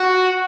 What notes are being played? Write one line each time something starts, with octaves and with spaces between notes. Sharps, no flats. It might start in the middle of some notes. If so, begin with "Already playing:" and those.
Already playing: F#4